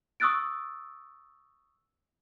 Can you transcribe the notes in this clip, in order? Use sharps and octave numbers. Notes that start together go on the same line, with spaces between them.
C#6 D#6 E6 F#6 A6 D7